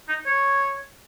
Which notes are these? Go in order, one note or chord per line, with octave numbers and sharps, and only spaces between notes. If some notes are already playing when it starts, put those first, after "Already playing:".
D#4
C#5